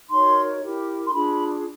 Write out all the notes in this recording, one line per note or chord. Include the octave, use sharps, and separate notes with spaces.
D#4 F#4 A#4 C#5 C6
E4 G4 A#4
C6
D4 F4 G#4 B5